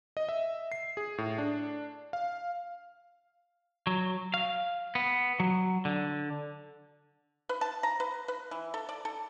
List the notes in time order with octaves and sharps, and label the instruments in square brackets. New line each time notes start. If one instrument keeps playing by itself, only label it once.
[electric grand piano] D#5
E5
C7
G#4
A2
D4
F5
[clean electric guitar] F#3
F5
B3
F#3
D3
[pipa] B4
A5
A#5
B4
B4
E3
A4
D5
A4